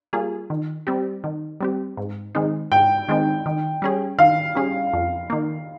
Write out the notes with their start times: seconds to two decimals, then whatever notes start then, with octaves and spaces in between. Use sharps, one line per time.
0.13 G3 A#3 F4 G#4
0.50 D#3
0.87 G3 C4 G4
1.24 D#3
1.61 G3 C4 G4
1.97 G#2
2.35 D#3 G#3 C4 D#4
2.72 G#2 G5
3.08 D#3 G#3 C4 D#4
3.46 D#3
3.82 G3 C#4 G#4
4.19 D#3 F5
4.55 G3 C#4 G#4
4.93 F2
5.30 D#3 A#3